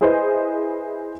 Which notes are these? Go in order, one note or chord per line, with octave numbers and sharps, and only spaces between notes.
E4 G#4 B4 C5 D#5